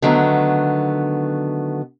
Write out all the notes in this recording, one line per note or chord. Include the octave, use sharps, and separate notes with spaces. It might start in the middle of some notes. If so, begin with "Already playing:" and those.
D3 D#3 F#3 A3 B3